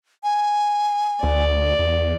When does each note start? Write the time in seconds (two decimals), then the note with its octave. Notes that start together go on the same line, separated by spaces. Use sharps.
0.24 G#5
1.23 D2 D5
1.79 E2